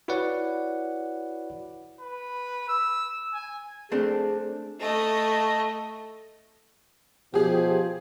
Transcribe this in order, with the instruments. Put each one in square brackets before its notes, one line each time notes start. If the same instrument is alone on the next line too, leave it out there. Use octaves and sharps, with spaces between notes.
[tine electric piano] E4 F#4 B4 C#5 D5 F#5
[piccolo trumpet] B4
E6
G#5
[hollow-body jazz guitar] A3 C4 D4 [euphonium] G#4
[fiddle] A3 D#5
[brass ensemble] B2 F3 [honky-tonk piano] G4 G#4